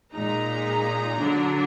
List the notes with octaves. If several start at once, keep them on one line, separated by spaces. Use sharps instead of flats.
A#2 G#3 D#4 A#5
D3 F#3 D4